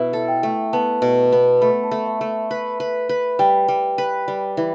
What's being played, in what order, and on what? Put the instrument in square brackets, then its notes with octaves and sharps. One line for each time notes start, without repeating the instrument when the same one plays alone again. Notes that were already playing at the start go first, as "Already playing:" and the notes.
Already playing: [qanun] B2 B3 E4 [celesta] E5
[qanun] A4
[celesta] G5
[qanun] A3
[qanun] B3 [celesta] A5
[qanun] B2
B3
[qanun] A3 [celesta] B5
[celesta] A5
[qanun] A3
[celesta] E5
[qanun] A3
[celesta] E5
[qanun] B4
B4
B4
[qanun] G3 [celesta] G5
[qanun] G3
B4
G3
E3